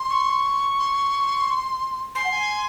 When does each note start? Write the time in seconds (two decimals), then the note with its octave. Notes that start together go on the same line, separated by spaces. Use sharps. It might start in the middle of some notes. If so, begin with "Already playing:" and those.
Already playing: C6
0.10 C#6
0.78 C6
2.15 G#5 C6
2.24 F#5
2.31 G#5